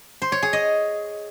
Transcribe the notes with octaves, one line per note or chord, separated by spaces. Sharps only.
C5
C#5
G#4
D#5